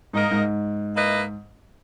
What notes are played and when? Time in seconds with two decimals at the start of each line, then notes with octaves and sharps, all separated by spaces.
0.13 G#2 A#3 D#4 A#4 D#5
0.31 G#2
0.94 A#3 E4 B4 D#5